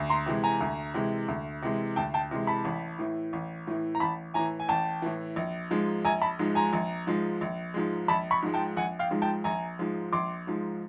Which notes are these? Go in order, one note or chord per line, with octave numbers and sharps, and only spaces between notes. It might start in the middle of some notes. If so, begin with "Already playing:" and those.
Already playing: D2
A#5 C6
C3 E3 G#3
G#5 A#5
D2
C3 E3 G#3
D2
C3 E3 G#3
D2 G5 A5
G5 A5
C3 E3 G#3
A5 B5
A1
A2 E3
A1
A2 E3
A#5
A1 A5 B5
A2 E3 G#5 A#5
G#5
A1 G5 A5
A2 E3
A#1
G#2 F3 G#3
A#1 G#5 A#5
A5 B5
G#2 F3 G#3
G#5 A#5
A#1
G#2 F3 G#3
A#1
G#2 F3 G#3
A#1 A5 B5
B5 C#6
G#2 F3 G#3
G5 A5
A#1 F#5 G#5
F5 G5
G#2 F3 G#3
G5 A5
A#1 G#5 A#5
G#2 F3 G#3
A#1 C6 D6
G#2 F3 G#3